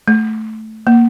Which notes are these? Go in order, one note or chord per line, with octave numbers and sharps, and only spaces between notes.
A3
A#3